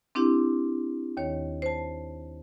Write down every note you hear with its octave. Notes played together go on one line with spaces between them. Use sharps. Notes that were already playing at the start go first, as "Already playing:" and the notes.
C4 D4 E4 G4
D#2 D#3 C#5
C5 A5